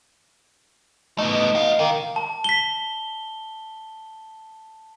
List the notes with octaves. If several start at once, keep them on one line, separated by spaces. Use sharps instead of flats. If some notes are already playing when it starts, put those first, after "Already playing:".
A3 B3 D#4
F#4 F5
D#3 A#3
A5
B6 G7